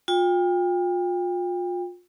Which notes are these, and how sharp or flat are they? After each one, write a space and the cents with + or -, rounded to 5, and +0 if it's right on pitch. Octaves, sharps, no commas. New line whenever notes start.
F4 +35 G5 +35